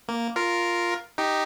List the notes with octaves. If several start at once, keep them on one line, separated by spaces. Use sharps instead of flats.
A#3
F4 A#4
D#4 G4